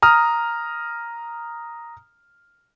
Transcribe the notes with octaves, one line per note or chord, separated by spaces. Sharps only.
A#5 D#6 F6